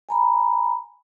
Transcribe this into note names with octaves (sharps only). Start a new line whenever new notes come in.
G#5 A#5 B5